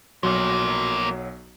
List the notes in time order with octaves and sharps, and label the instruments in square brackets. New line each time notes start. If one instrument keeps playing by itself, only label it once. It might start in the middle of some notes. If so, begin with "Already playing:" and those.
[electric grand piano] B1 F#3 [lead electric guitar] F3 A#3